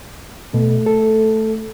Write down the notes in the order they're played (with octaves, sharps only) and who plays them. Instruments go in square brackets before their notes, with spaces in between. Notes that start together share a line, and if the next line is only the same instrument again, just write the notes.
[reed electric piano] B2 [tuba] A3
[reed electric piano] A4